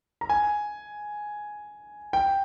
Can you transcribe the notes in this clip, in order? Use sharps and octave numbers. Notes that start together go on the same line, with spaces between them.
A#5
G#5
G5